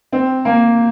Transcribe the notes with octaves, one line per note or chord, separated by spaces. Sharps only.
C4
A#3